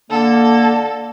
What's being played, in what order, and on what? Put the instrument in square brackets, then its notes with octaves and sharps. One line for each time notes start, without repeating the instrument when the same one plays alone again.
[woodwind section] D3 A#3 [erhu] A4